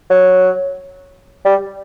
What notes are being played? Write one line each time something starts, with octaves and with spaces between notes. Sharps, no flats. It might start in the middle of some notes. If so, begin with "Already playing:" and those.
F#3
G3